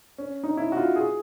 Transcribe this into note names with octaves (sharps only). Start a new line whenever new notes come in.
C#4
D#4
E4
F#4
F4
G#4